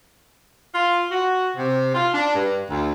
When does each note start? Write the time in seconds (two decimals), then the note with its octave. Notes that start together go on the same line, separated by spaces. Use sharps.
0.74 F4
1.11 F#4
1.57 C3
1.95 F4
2.14 D4
2.35 G2
2.71 D2